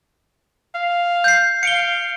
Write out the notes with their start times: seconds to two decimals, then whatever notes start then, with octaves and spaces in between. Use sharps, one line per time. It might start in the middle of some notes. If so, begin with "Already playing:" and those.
0.75 F5
1.24 G6 C7
1.63 F5 C#7 D7 G7